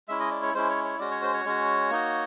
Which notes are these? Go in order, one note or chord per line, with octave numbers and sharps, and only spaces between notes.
G#3 C#4 E4 E5
D#5
D5
C#5
G#3 C#4 E4 C5
C#5
C#5
G#3 C#4 F#4 D5
C#5
C5
C#5
G#3 C#4 F#4
A#3 D#4 F#4